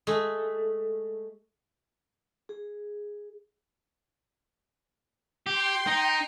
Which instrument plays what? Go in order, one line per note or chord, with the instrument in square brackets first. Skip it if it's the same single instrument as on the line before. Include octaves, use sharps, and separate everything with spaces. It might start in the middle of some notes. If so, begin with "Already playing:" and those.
[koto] G#3 A3
[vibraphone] G#4
[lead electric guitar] G4 [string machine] G5 C6
[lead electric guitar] D#4